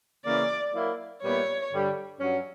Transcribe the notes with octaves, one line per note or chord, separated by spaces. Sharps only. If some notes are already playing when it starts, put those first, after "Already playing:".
C#3 E3 A#3 C#4 D5
F#3 A#3 E4
A#2 G3 B3 E4 C#5
G2 D3 G3
G2 F#3 C#4